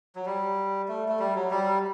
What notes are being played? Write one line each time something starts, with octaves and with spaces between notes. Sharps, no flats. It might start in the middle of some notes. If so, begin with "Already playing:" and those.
F#3
G3
A3
A3
G3
F#3
G3